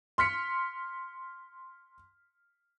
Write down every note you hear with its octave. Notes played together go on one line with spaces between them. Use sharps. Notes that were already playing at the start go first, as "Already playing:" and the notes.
C6 F6 B6 C#7